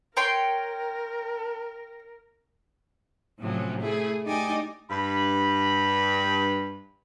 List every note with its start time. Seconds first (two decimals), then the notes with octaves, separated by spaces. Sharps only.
0.17 A#4 C#5 G5 C6
3.41 A2 C3 F3 F#3 C#4
3.80 A3 E4 G#4
4.25 A3 D#4 G4 D5 D#5 G#5
4.91 G2 B5